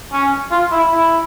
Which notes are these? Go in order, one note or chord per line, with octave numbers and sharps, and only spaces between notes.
C#4
F4
E4
E4